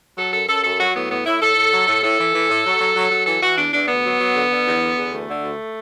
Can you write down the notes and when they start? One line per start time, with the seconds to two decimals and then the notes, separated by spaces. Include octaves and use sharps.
0.17 F#3 A4
0.32 F#2 A4
0.48 F#2 A4
0.63 F#2 A4
0.79 F#3 F#4
0.95 A2 B3
1.10 A2 B3
1.26 A2 E4
1.41 A2 A4
1.56 A2
1.72 F#3
1.87 A2
2.03 A2 A4
2.19 E3
2.33 E3
2.49 A2
2.65 F#3
2.80 F#3
2.95 F#3
3.11 F#3
3.26 E3 A4
3.42 E3 F#4
3.57 E2 D4
3.72 E2 D4
3.88 D2 B3
4.04 F#3
4.19 F#3
4.35 D3
4.51 D3
4.66 E2
4.81 D3
4.97 E2
5.11 D2 A3
5.28 D3
5.43 D2